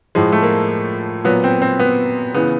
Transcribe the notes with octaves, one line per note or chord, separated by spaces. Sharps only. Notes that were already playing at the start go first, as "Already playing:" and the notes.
A2 F3 G#3
A3
A#3
A#2 F#3 B3
C4
C4
B3
C#3 E3 B3